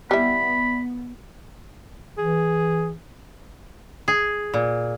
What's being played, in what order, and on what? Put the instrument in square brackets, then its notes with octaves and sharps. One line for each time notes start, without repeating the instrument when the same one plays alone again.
[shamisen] G3 E4 [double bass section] B3 [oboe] B5
[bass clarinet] E3 [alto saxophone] G#4
[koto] G#4
A#2